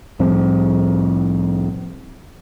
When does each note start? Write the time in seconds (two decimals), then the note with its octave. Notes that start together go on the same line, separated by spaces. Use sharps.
0.19 C2 A2 F3 C4